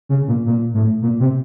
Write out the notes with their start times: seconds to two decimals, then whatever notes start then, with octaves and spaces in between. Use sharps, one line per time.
0.09 C#3
0.28 A#2
0.46 A#2
0.74 A2
1.02 A#2
1.20 C3